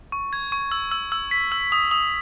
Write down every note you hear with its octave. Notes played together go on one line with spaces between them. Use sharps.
C#6
G#6
C#6
E6
E6
E6
B6
E6
D#6
D#6